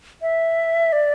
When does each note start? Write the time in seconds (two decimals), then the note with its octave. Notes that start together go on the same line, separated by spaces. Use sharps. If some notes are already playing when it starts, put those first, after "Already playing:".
0.22 E5
0.93 D5